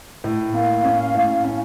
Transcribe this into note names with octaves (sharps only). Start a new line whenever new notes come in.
A2
A#3 F5
C#4
A2
C#4